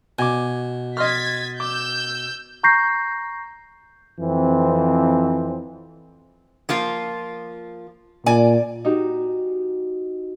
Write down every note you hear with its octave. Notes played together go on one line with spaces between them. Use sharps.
B2 G#5 D6
D#5 C6 F6 G#6 A6 B6
D6 E6 G6
A#5 C#6 G6 A#6 C7
F2 E3 C4
F3 A#3 F4
A#2 D5 G#5
D#4 F#4 G4